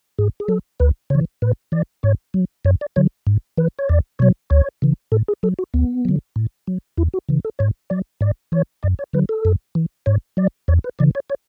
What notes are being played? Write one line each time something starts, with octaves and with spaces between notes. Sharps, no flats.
G#2 G#4
G#4
F#3 A4
D2 B4
C#3 E3 C#5
A2 B4
E3 D5
G#2 C#5
F#3
F#2 C#5
D5
D3 F#3 C#5
G#2
E3 B4
C#5
E2 D5
B2 F#3 C#5
D2 C#5
C#3 E3
A2 A4
G#4
F#3 A4
F#4
D2 B3
D3 F#3
A2
F#3
E2 E4
F#4
C#3 E3
A4
G#2 C#5
F#3 D5
G#2 D5
E3 C#5
F#2 D5
C#5
D3 F#3 B4
A4
F#2
E3
G#2 C#5
F#3 D5
E2 C#5
B4
C#3 E3 D5
C#5
C#5